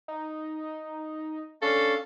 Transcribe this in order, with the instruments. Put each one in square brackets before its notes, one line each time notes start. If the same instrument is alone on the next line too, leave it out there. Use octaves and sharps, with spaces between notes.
[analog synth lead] D#4
[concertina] C#4 D4 F5 [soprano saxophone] A4